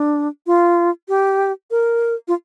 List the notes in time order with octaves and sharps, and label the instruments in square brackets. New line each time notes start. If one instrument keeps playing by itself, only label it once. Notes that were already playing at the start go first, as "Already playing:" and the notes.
Already playing: [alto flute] D4
F4
G4
A#4
F4